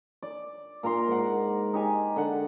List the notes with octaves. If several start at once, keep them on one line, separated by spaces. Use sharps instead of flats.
D5
A#2 A#4 A#5 C6
G#2 F#5
D#4 G4 G#5
D3 F#5